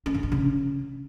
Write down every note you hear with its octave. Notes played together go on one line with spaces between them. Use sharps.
C#4
D3
D4
C#3